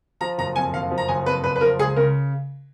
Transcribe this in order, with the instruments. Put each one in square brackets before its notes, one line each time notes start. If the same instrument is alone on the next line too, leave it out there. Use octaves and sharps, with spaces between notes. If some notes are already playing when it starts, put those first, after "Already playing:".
[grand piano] F3 A#5
F#1 A#5
F2 G#5
F#1 F5
F3
A#5
F#1 G#5
F2 B4
F#1 B4
B4
F3 A#4
C#2 G#4
C#3 A#4